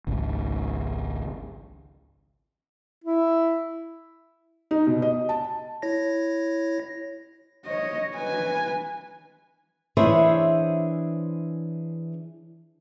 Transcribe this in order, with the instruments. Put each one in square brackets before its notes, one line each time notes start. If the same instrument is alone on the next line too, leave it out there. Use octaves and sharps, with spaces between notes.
[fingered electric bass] G#1 C#2
[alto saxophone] E4
[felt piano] D#4
B2
D#5
A5
[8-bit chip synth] E4 C#5 A#6
[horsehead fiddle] C#5 D#5
B4 G#5
[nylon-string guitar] E3 D4 G#4 C5 C#5 E5